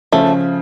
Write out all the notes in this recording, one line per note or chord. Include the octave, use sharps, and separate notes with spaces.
C#3 F3 A3